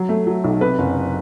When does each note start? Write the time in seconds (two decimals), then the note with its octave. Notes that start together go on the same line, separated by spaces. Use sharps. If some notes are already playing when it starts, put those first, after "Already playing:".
Already playing: F#3
0.09 A3
0.27 F#3
0.44 B1
0.61 C3 B4
0.78 F#1